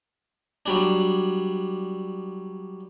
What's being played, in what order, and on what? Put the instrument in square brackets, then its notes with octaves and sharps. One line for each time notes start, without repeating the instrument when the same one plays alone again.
[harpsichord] F#3 G3 D4